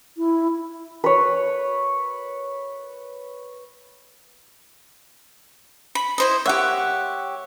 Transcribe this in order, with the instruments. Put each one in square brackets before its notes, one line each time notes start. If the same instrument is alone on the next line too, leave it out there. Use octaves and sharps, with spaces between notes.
[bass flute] E4
[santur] B4 C#5
[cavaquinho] B5
E4 C5 D#5
[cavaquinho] G4 E5 [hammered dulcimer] C#5 F#5